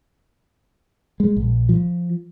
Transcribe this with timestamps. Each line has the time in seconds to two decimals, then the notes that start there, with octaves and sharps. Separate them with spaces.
1.20 G#3
1.37 A#1
1.69 F3